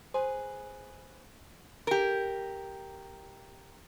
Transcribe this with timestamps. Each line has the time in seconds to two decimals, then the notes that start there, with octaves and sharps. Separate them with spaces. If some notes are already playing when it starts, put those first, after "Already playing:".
0.14 G#4 B4 C5
1.87 G4 A#4